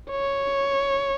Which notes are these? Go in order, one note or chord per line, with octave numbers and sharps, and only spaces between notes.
C#5